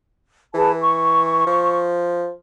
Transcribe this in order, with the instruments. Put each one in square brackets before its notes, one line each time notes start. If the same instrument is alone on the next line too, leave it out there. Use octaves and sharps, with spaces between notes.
[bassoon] E3 [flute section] G#4 B4 A5
[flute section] C#6
[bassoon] F3